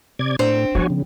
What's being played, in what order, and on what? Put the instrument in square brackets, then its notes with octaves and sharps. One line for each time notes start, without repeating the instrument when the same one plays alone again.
[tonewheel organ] C3 D5 G#6
[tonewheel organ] A2 [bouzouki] C4 [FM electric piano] D4
[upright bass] F3 B3 [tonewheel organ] F#4 C#5 G#5
[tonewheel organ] C#3